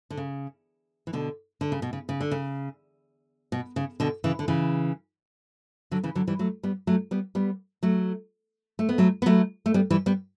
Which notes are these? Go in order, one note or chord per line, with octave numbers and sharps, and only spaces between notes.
D3
C#3
E3
B2 D3
D3
C#3
B2
C#3
C#3
D3
C#3
B2
C#3
B2 D3
C#3 E3
D3
C#3 E3
D3 F#3
C#3 E3
D3 F#3
E3 G3
F#3 A3
G3 B3
F#3 A3
G3 B3
G3 B3
F#3 A3
A3
B3
F#3 A3
B3
F#3 A3
A3
G3 B3
E3 G3
G3 B3